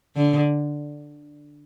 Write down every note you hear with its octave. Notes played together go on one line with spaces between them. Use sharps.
D3